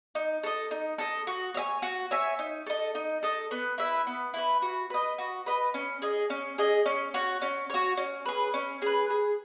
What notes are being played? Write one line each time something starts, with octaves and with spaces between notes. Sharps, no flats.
D#4
A4 D#5
D#4
A4 D#5
F#4
C#5 E5 G#5
F#4
C#5 E5 G#5
D#4
A4 D#5
D#4
A4 D#5
B3
E4 B4 E5
B3
E4 B4 E5
F#4
B4 D#5
F#4
B4 D#5
C#4
G#4 D#5
C#4
G#4 D#5
C#4
F#4 C#5
C#4
F#4 C#5
C#4
G#4 B4
C#4
G#4 B4
G#4